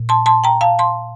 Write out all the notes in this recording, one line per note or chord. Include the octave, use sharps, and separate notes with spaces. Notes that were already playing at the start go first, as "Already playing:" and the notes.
Already playing: A#2
A5 C6
A5 C6
G5 A#5
F5 A5
A5 C6